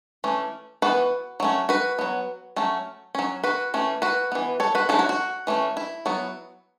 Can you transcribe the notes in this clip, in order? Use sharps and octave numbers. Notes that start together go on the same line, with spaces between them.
E3 A3 C#4
E3 B3 F#4 B4
F#3 A3 C#4
F#4 B4
F#3 B3
F#3 A3 C#4
F#3 C#4
F#4 B4
E3 A3 C#4
F#4 B4
E3 B3
A4 C#5
F#4 B4
F#3 A3 C#4 E4 A4
F#4
F#4
E3 A3 C#4
E4
F#3 B3